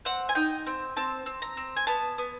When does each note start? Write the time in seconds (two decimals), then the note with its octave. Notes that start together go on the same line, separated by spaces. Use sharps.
0.05 C4 F#5
0.29 G#5
0.35 D#4 G5
0.67 C4
0.96 C4 A5
1.26 C4
1.42 A#5
1.57 C4
1.76 G#5
1.87 B3 A5
2.18 B3